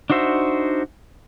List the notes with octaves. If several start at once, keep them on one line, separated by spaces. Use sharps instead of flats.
D4 D#4 F#4 C5 E5